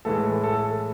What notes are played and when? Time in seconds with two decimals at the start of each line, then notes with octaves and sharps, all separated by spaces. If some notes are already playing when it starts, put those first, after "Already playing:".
0.05 A2 E3 G#3 A4
0.44 A4